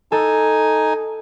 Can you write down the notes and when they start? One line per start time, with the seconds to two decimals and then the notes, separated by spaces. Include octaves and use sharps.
0.12 D#4 A4 G#5